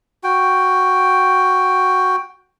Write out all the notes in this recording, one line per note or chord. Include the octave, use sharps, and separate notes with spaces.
F#4 G5